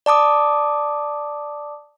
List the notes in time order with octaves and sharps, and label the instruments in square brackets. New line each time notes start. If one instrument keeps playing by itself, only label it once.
[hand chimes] D5 A5 D6 D#6